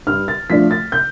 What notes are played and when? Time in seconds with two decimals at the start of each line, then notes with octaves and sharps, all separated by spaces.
0.07 G2 F6
0.28 A6
0.50 F3 A3 D4 B6
0.71 A6
0.92 G6